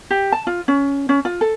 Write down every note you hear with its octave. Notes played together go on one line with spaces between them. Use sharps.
G4
A5
F4
C#4
C#4
F4
A4